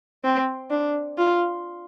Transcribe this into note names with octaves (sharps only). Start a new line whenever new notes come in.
C4
D4
F4